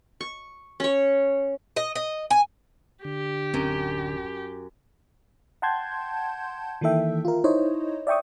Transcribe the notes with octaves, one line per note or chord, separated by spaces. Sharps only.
C#6
C#4 C#5
D#5
D#5
G#5
D3 G4
D1 F#2 C4
F#5 G5 A5 C6 G6 G#6
D#3 E3 A#3 A4 E5 G5
F4 A#4
D#4 E4 C5 C#5 D#5
D5 E5 G5 C#6 D#6